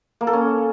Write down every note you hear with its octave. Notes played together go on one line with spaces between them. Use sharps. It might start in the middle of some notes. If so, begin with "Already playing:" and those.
A#3
A4
C#4